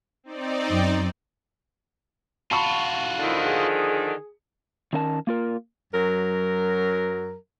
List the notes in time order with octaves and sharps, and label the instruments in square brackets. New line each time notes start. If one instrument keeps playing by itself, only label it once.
[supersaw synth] C4 D#4 D5
[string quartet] F#2
[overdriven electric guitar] F4 F#4 [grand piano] A5 B5 C#6
[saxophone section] D3 D#3 F3 [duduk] E4
[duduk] G#4
[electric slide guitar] D#3 C#4 A#4 E5 A5
A#3 F4 A#4
[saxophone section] F#2 F#3 A#4